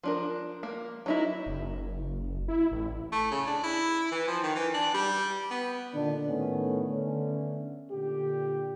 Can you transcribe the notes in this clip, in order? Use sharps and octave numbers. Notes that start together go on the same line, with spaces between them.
F3 D4 A#4
A#3
F#3 D#4 E4
F#1
E4
A1
A3
C#3
D4
E4
E3
F3
D#3
E3
D4
G3
B3
A#2 D3 D#3 D4
A2 D#3 A3 B3 C#4
D3 A3 B3 C#4
A#2 D3 G4